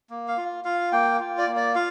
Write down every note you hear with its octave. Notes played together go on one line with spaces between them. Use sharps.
A#3
F5
F4
F4 F5
A#3 G5
F4
D5
A#3
D5
F4 F5